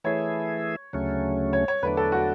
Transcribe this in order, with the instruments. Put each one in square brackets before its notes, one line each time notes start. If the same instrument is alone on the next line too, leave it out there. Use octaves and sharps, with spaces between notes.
[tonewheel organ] E3 A3 E4 G#4 [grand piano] C#5
[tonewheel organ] D2 C#3 F#3 A3 C#4
[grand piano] C#5
C#5
[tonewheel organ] E2 D3 F#3 A3 D4 [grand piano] B4
[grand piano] A4
F#4